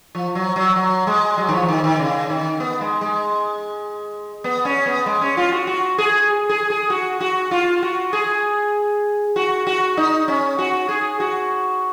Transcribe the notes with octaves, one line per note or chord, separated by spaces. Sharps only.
F3
F#3
F#3
F#3
G#3
F#3
D#3
F3
D#3
D#3
C#3
D#3
B3
G#3
G#3
B3
C#4
B3
G#3
C#4
F4
F#4
F#4
G#4
G#4
G#4
F#4
F#4
F4
F#4
G#4
F#4
F#4
D#4
C#4
F#4
G#4
F#4